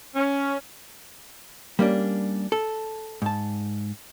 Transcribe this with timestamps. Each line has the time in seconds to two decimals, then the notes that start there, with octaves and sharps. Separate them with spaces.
0.15 C#4
1.79 G3 A#3 C#4 D4
2.52 A4
3.22 G#2 A5